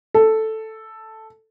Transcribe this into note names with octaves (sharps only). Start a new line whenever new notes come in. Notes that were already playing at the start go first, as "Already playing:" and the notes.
A4